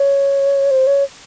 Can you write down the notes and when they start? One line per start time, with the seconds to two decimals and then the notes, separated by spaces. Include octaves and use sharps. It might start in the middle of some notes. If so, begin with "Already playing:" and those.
Already playing: C#5
0.71 C5
0.87 C#5